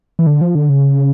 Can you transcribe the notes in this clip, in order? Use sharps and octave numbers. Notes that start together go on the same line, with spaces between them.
E3
D3
F3
D3
C#3